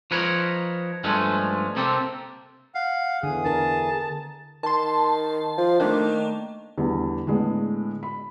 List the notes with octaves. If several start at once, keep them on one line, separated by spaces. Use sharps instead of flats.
F3 D#4 A#4 B4 C#5
G2 F3 G#3 A3 C#4
C3 A#3 C4 G4 A4
F5 F#5
E2 D3 G#4 D#6
D3 A#4 A5
D#3 A5 C6
F3
D#3 A3 A#3 D4
E2 D3 G3
A2 D3 G#3 B3
B5